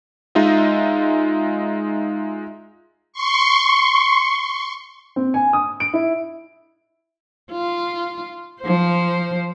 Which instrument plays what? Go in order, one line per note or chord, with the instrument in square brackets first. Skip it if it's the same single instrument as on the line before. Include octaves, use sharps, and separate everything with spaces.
[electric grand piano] G#3 D#4 F4 D#5 E5
[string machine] C6 C#6
[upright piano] C4
G#5
D#6
D7
E4
[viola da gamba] F4
F3 C5